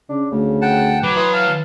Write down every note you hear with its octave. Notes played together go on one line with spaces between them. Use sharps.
C#3 D4
D2 C#3
F#5 G5 A5
F#3 B4 D6
E3 B4 C6 D#6
F5 A5